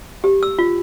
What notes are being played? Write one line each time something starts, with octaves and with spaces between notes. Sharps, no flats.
G4
E6
F4